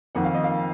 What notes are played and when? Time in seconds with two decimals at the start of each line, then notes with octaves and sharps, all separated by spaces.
0.15 F2 D#3 A#3 F#5
0.24 F5
0.34 D#5
0.44 F5